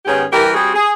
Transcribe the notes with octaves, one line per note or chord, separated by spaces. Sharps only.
G#2 D#3 B3 C#4 G4 G#4
E3 G3 G4 A#4
G3 C4 F#4 G#4
G#4